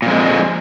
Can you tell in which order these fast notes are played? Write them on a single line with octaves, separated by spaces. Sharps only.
A#2 F2 G#3